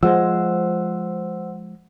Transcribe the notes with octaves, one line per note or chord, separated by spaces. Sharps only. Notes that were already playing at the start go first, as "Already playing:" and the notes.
F3 G#3 C5 F#5 E6